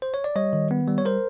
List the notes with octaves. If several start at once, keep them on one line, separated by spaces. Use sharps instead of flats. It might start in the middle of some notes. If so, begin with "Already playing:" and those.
C5
C#5
D5
G3 C#5 D#5
D#3
B3
G3
C#5
A#4 C5